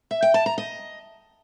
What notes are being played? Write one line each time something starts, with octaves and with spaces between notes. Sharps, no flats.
E5
G5
A5
A#5
D#5